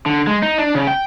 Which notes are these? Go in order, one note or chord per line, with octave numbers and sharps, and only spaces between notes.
D3
G#3
D#4
D4
C#3
G5